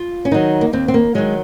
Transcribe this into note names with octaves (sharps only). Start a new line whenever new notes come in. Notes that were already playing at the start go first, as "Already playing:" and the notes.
Already playing: F4
C#4
D#3 F#3 D#4
A#3
D#2 C4
C4
A#3
D#3 F#3 G#3